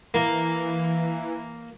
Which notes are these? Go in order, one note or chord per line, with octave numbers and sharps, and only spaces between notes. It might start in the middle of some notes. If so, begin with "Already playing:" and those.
E3 A#3